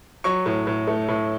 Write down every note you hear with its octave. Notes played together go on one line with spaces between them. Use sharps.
F#3 C#6
A2
A2
A3
A2